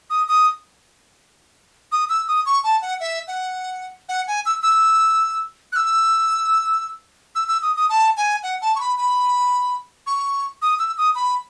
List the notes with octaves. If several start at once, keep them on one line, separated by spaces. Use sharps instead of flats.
D#6
D#6
D#6
E6
D#6
C#6
A5
F#5
E5
F#5
F#5
G#5
E6
E6
F#6
E6
E6
E6
D#6
D#6
A5
G#5
F#5
A5
C#6
B5
B5
C#6
D#6
E6
D#6
B5